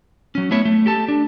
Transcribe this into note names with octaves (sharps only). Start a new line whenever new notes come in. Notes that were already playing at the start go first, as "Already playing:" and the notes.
F#3 C#4
A3 B3 E4 C#5 E5
A3
G4 A4 A5
D4